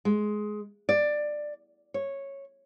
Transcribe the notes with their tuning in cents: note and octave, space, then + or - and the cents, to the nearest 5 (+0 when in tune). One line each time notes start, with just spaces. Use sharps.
G#3 +15
D5 +15
C#5 -10